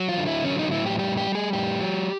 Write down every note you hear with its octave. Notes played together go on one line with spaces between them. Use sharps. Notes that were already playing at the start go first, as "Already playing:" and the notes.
Already playing: F#3
F4
D3
E4
F#3 C#4
D#4
A2 E4
G4
G3 G4
G4
G3
G#4
A2 G4
F#3